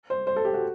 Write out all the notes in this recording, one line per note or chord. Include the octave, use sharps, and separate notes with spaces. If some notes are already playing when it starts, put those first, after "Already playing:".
C5
C5
A4
G4
F#4